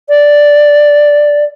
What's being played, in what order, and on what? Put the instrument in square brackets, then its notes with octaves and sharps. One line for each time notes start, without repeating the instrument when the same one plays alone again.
[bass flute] D5